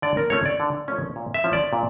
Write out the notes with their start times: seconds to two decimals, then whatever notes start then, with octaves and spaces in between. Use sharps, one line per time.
0.02 D3 D5
0.17 A#4
0.30 F3 A3 C#4 C#5
0.46 D5
0.60 D3
0.88 F3 A3 C#4
1.16 A#2
1.34 E5
1.44 F3 C#4 E4
1.53 D5
1.73 A#2